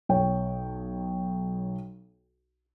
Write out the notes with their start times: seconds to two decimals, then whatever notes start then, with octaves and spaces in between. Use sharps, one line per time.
0.09 B1 C#5 G5